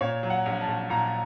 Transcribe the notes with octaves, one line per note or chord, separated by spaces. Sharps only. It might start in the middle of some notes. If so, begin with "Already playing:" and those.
A#2 C#5
F#3
F#5
A#1
A5
A#1
A#2 A#5